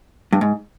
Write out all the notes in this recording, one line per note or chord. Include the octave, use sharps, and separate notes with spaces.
G2
G#2